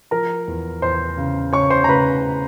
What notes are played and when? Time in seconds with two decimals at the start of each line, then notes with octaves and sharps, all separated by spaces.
0.11 F3 A#4 A#5
0.48 E2
0.82 E2 C5 C6
1.17 C#3
1.53 C#3 C#5 C#6
1.70 C5 C6
1.84 A#5
1.88 C#3 B4 B5